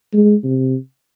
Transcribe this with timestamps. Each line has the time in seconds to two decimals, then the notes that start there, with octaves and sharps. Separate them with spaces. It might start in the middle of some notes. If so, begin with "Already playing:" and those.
0.14 G#3
0.44 C3